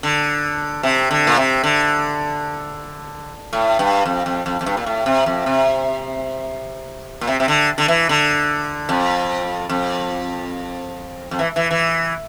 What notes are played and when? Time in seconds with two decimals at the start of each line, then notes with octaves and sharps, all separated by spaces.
0.03 D3
0.83 C3
1.11 D3
1.27 A#2
1.37 C3
1.64 D3
3.53 A2
3.79 G2
4.05 F2
4.26 F2
4.46 F2
4.61 F2
4.66 G2
4.77 A#2
4.86 A2
5.06 C3
5.26 F2
5.46 C3
7.21 A#2
7.27 C3
7.40 C3
7.48 D3
7.78 D3
7.88 E3
8.09 D3
8.89 F2
9.69 F2
11.31 F2
11.39 E3
11.56 E3
11.71 E3